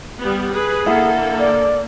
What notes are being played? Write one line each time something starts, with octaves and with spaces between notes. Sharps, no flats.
G3 B3
G#4 B4
D3 A#3 E4 A4 F#5
D5